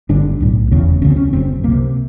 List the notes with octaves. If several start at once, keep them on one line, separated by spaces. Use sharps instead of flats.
G1 G2 D3 D4
B1 A2
F1 E2 C#3
D2 C#3 C#4
C4
C#4
F#1 F#2 C#3 C4
C2 C3 A#3